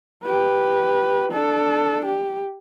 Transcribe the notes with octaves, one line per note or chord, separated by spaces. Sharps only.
G4 B4
D4 A4
G4